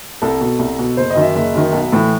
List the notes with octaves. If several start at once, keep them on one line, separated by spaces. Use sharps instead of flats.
C2 A4
B2
C2
B2
F#1 C5
D#5
F#2 D#3
E5
F#1 E5
F#2 D#3
B1
A2 E3